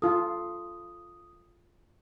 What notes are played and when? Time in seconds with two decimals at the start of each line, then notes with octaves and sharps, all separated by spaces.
0.02 F4 A4 D#6